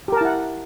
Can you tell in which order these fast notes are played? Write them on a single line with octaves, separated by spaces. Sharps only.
G4 A#4 A5 E4 F#5